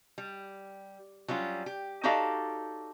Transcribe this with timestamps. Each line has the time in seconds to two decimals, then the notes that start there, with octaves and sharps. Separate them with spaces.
0.18 G3
1.28 F#3 G3 C#4 F4
1.66 G4
2.03 D#4 F#4 G4 A4 D5 F5